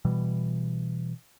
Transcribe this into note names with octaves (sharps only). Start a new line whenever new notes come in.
B2 E3 G3